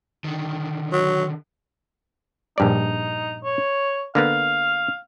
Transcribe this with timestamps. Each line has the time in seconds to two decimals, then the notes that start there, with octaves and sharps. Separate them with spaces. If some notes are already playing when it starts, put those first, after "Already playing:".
0.24 D3 D#3
0.92 F#3
2.58 A#1 G2 D#4 D5
3.44 C#5
4.15 D3 A#3 B3 F5